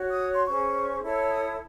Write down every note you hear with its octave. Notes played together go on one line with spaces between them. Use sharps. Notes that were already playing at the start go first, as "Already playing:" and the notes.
Already playing: F#4 C#5
D#6
C6
C#4 G#4 C5 C#6
E4 A4 C#5
D#6